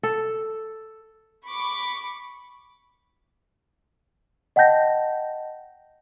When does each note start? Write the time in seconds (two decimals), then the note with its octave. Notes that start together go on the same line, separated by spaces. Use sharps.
0.03 A4
1.46 B5 C#6 D6
4.56 D#5 F#5 G5 A5 G6 A#6